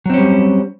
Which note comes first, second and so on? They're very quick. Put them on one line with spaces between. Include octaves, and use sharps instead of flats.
F#3 C4 C#4 G3